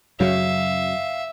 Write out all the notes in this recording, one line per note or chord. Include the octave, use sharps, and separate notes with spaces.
F#2 C#3 F#3 E5 F5